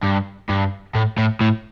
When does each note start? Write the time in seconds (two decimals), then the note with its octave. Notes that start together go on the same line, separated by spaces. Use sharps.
0.03 G2
0.49 G2
0.95 A2
1.18 A2
1.41 A2